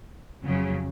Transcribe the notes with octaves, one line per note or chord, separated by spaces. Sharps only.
F2 C#3 F#3